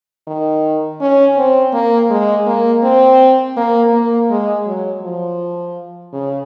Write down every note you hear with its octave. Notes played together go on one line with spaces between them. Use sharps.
D#3
C#4
C4
A#3
G#3
A#3
C4
A#3
A#3
G#3
F#3
F3
C#3